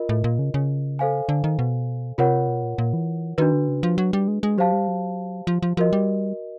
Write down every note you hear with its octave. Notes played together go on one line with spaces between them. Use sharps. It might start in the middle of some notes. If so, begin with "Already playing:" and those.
Already playing: F4 A#4 D#5
A2
A#2
C#3
C#3
A4 C5 F5 G#5
D3
D#3
B2
C3 F4 A#4 C#5 F#5
B2
A#2
A#2
E3
D#3 D4 F#4 B4
D3
C#3
F3
F#3
G3
G#3
G#3
F#3 G4 C5 F5 A5
G3
F#3
F3
F3
F3 F#4 A#4 D#5
G3